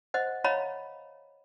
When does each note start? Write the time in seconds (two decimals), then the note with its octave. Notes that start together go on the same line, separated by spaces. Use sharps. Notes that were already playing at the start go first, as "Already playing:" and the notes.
0.14 C5 D#5 F#5
0.44 C#5 D#5 F5 F#5 A#5 B5